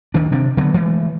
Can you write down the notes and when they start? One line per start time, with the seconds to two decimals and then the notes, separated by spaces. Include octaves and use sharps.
0.14 D2 D#3 D4
0.32 C3 D#3 C4 D4
0.57 D3 F#3 A3 B3
0.74 E3 G#3 A3